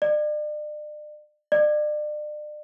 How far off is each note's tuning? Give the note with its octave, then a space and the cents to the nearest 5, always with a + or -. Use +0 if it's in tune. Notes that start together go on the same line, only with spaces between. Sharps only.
D5 +35
D5 +35